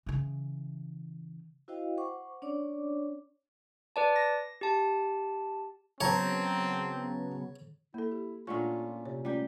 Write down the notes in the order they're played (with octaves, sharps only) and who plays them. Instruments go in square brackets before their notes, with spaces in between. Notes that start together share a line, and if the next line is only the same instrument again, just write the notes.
[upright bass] C#3 E3
[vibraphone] E4 F#4 C5 D#5 F5 G5
C5 F#5 C#6 D6
C#4 D4 C#5 D5 D6
[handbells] B4 D5 A5
A#6
G4 A5
[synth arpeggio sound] C#3 F#3 B3 [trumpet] C4 [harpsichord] C#5 [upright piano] A5 A#5
[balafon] A#3 A4 [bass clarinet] E4
[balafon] G4
[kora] A#2 A3 C#4 [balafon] D4 F#5 C#6 [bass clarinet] F4
[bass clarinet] C3 [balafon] C#5
[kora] G3 G4 [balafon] A3 C#4 F4